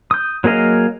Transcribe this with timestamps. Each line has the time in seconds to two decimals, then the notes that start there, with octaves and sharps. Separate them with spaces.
0.11 D#6 G6
0.44 F#3 A#3 G#4 D#5 F5